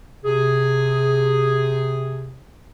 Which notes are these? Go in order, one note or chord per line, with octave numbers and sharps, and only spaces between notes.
C3 G#4